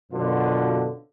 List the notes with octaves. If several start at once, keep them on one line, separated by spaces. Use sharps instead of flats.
F#2 B2 D3 F4